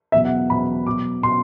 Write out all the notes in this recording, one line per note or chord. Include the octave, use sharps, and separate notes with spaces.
E2 B2 F#3 E5
F#5
E2 B2 F#3 B5
B2 F#3 D6
B2 C6